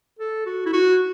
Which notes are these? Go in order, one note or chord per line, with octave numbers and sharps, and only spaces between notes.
A4
F#4
E4
F#4